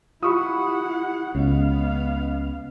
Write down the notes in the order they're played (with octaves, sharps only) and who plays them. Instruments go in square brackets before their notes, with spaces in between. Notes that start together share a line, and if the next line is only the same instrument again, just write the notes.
[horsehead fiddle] E4 F#5 [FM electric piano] F4 G4 [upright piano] B5 C#6 D#6
[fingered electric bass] C#2 [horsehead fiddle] B3 F5 [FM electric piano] C#4 D#5